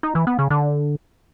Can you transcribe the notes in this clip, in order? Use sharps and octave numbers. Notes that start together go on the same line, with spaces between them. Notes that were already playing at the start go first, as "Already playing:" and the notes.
D#4
E3
B3
C#3
D3